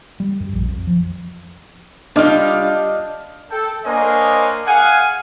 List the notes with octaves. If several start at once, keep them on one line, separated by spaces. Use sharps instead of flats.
G3
F#2
A#1
F2
F3
G3 D4 F4 D#5 F6
A4 G5
A#3 D4 C5 C#5 D#5 G#5
G#4 F5 F#5 G#5